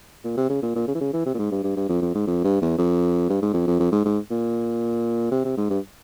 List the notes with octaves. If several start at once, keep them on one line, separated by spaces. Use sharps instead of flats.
A#2
C3
C#3
A#2
A#2
C#3
E3
C#3
E3
C3
A#2
G#2
G2
G2
G2
F2
F2
G#2
F2
G2
E2
F2
G2
G#2
F2
F2
F2
G#2
G#2
A#2
C3
C3
G#2
G2